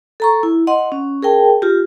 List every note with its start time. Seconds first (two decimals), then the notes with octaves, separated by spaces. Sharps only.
0.20 A4 A#5 C#6
0.43 E4
0.67 D#5 F#5 C6
0.92 C#4
1.23 G#4 A#4 G5 A5
1.62 F4 G4